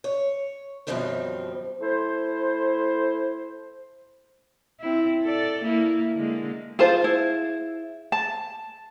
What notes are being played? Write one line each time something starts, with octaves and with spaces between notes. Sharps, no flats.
C#5
F#2 B2 D#3 F3 G3 C4
A3 E4 C5
C4 E4
A4 D5
A#3 E4
D3 G#3 A#3
F4 G#4 C5 F5 A5
E4
A5